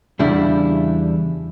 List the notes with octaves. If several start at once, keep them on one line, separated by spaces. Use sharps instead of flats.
E2 C#3 G3 D4 E4